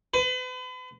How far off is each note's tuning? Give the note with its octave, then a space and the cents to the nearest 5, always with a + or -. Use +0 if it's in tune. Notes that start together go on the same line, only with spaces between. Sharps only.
B4 +40